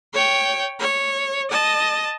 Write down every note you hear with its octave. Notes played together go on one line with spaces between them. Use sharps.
C#5 G5
C#5
D#5 A5